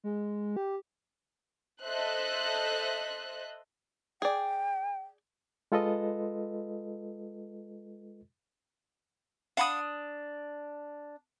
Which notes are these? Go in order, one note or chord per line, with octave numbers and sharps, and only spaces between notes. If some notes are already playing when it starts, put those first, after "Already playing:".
G#3
G4
A4 C5 D#5 E5 F#6
G#4 D5 G5
G#3 F4 A4 B4 D#5
D4 F5 F#5 B5 D#6